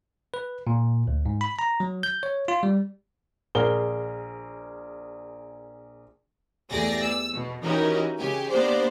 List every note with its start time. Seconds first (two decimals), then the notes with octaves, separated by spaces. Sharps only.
0.34 B4
0.67 A#2
1.07 D2
1.26 G#2
1.41 B5
1.59 A#5
1.80 F#3
2.03 G6
2.23 C#5
2.48 F4
2.63 G3
3.55 A#1 G#4 A#4 G7
6.70 E2 A3 G4 G#4 D5 A#6
7.02 E6
7.34 B2
7.63 E3 C#4 D#4 F#4 G4 A#4
8.18 C#3 G4 G#5
8.50 A#3 B3 D4 G4 C5 D5